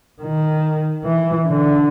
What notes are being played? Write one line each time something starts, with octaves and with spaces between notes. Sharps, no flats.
D#3
E3
D3